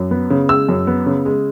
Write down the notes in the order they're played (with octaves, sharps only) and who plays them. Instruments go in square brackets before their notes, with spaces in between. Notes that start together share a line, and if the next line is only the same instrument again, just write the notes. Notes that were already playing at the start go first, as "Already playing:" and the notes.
Already playing: [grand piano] F#2
B3
C#3
G#3 E6
F#2
B3
C#3
G#3